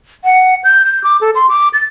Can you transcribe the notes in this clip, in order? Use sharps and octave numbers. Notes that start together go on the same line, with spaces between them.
F#5
G6
G6
D6
A4
C6
D6
A6